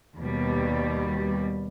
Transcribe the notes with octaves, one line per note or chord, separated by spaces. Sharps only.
D#2 B2 G3